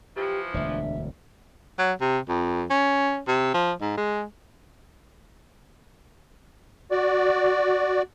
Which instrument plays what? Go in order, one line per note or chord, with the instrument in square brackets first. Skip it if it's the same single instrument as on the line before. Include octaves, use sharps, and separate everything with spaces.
[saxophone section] E3 F3 [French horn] G4
[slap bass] E1 D2 [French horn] D4 [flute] E5
[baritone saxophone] F#3
C3
F2
C#4
C3
F3
G#2
G#3
[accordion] F#4 D5